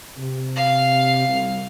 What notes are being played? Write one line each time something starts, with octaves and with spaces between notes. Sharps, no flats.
C3
F5
C2